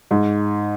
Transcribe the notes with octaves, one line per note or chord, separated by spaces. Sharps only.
G#2